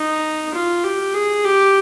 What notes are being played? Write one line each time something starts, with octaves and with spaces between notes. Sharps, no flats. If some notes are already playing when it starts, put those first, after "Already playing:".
Already playing: D#4
F4
G4
G#4
G4